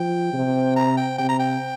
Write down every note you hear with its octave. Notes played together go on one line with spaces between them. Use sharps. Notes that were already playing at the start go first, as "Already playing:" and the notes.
Already playing: F3 G5
C3
A#5
G5
C3 G5
A#5
G5